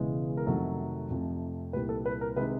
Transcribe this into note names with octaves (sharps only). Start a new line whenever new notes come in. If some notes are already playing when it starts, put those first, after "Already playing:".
Already playing: E1 E2 C#3 E3 G#3
A#4
F2 C3 D#3 F#3 A3 A4
F2 C3 F3 A3
C2 A#2 G3 B4
A4
B4
A#4
C3 D#3 G#3 B4